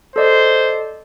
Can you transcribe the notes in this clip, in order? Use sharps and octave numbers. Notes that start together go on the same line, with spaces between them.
A4 C5 D5 D#5